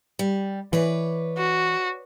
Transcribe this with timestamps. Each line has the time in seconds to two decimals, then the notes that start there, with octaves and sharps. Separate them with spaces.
0.19 G3
0.73 E3 B4 C#5 D5
1.38 F#4